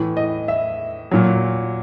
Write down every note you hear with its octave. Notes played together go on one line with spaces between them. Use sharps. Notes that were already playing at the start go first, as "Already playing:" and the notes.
Already playing: A2 E3
D#5
E5
A#2 F#3